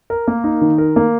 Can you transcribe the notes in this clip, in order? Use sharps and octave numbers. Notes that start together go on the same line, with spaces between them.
A#4
A#3
D#4
D#3
A#4
A#3